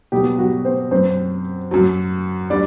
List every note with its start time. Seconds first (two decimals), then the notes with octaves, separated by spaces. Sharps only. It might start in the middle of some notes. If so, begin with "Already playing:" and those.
0.12 B2 F#3 G3 G4
0.39 F#3 F#4
0.65 C4 C5
0.91 F#2 F#3 C4 C5
1.71 F#2 F#3
2.50 G3 D4 D5